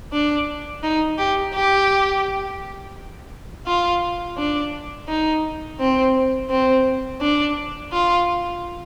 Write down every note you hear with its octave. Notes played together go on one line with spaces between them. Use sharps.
D4
D#4
G4
G4
F4
D4
D#4
C4
C4
D4
F4